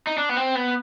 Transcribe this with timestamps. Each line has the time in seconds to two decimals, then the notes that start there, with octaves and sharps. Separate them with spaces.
0.07 D#4
0.18 D4
0.29 B3
0.36 C4
0.55 B3